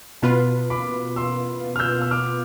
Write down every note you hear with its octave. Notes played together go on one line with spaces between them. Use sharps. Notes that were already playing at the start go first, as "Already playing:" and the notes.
B2 B3 F4 B4 A5 C6
B5 D6
C6 E6
F6
E6 G6
E6
D6 F6